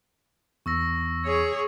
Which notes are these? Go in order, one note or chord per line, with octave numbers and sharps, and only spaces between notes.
E2 C#6 E6 A#6
G#4 C#5